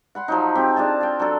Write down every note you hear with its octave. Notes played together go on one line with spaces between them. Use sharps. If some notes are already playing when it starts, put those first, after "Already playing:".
F#5 B5 C6
F3 F#3 D#4
C4 G4
D4 F4 G#4 A5
F5 G5
F#3 D4 A4